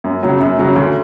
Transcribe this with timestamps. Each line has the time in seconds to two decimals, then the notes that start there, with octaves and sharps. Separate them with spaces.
0.04 F#2
0.23 C#3 F#3
0.40 F#2
0.58 C#3 F#3
0.76 D2